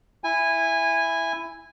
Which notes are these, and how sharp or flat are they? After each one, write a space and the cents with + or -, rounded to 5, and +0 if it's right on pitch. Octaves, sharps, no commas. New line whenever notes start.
E4 +5 G#5 -15